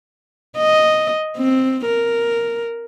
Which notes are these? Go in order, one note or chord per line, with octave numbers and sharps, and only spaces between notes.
D#5
C4
A#4